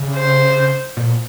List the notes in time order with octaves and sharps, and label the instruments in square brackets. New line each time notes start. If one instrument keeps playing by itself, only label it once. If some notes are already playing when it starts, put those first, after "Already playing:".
Already playing: [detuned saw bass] C#3
[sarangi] C5
[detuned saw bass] A#2